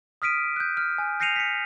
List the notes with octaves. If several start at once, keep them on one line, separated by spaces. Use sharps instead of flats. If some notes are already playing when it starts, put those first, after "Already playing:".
D#6 F6 B6 D7 D#7
F#6 G6
F6
G#5
G6 A#6 C7 C#7 D#7 F7
B6 C#7